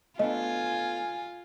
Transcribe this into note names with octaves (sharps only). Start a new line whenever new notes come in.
A3 B3 D4 F4 D#5 G#5